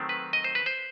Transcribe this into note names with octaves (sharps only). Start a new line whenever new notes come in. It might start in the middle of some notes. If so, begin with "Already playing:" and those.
Already playing: D#3 F#3 A3 C4
B4
D#5
C5
B4
C5